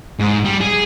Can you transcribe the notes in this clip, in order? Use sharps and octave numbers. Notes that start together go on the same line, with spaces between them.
G#2
G3
G#4